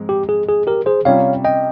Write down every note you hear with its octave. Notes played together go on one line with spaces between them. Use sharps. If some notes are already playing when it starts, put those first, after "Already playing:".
Already playing: G#2 F3 G#3 C4
G4
G#4
G#4
G4 A#4
G#4 C5
C3 G3 C#4 F4 C#5 F5
D#5 G5